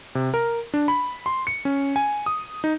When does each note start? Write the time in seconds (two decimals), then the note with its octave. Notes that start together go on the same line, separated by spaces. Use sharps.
0.15 C3
0.34 A#4
0.74 D4
0.88 B5
1.26 C6
1.47 C#7
1.65 C#4
1.96 G#5
2.26 D#6
2.64 D#4